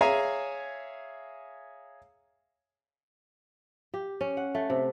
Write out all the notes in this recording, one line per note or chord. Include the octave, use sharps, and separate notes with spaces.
G#4 C#5 E5 F5 G#5 A#5
G4
C#4
F#5
A3
C3